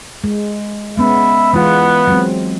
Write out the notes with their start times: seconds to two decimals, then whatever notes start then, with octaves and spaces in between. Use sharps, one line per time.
0.24 G#3
0.98 G#3 B3 C#4 E5 B5
1.53 E3 G#3 B3 F4 F#5
2.07 F#3 G#3 C4